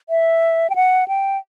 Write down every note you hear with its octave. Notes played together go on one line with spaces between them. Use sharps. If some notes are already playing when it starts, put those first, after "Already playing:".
E5
G5
F#5
G5